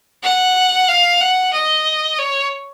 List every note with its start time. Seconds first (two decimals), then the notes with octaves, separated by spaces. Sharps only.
0.23 F#5
0.89 F5
1.21 F#5
1.53 D#5
2.19 C#5